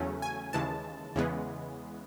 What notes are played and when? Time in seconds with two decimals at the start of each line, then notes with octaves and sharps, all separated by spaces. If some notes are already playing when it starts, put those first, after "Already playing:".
Already playing: E2 C#3 F#3 A3 C#4
0.22 G#5
0.53 D#2 C#3 E3 G#3 A5
1.16 E2 C#3 E3 G#3 B3